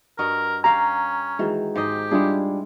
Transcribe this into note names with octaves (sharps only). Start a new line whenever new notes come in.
G2 F#4 A#4 D#5
C#4 G4 A#4 F5 A#5
D#3 E3 G#3 F#4
G#2 G4 C5 D#5
G3 G#3 D4 E4 F4 G#4